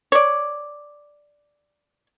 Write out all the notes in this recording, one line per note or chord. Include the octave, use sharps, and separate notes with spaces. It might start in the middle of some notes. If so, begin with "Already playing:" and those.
C#5 D5